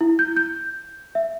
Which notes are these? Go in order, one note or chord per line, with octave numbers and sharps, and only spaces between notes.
E4
G6
G6
E5